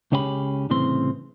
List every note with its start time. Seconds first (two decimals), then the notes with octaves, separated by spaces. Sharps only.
0.12 C#2 C#3 C#4 G4 A4 B5
0.70 C2 A2 C#3 E3 C4 C6